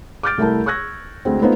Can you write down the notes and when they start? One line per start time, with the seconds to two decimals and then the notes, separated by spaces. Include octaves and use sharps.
0.23 D6 F6 G6 A6 D7
0.38 C2 A3 E4 A#4 A5
0.66 C#6 E6 F#6 G#6 A#6
1.25 D2 G#3 C4
1.42 A3 B3 D#4 F4 C5